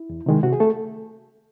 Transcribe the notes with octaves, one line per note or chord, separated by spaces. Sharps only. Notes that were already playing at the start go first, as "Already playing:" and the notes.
Already playing: E4
E2
C3 D#3 G#3
C3 F#4
G#4
A3 A4